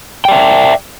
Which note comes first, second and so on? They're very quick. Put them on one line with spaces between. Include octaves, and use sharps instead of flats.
G5 D5 E5